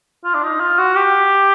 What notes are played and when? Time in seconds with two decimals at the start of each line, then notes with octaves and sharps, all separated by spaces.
0.25 F4
0.35 D4
0.43 D#4
0.60 F4
0.78 F#4
0.96 G4